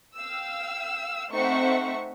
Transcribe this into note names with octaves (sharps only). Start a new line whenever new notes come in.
F5 G5 E6
A3 C4 D#4 E5 F#5 C#6